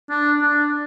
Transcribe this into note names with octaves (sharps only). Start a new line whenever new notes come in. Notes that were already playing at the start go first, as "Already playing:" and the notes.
D4
D4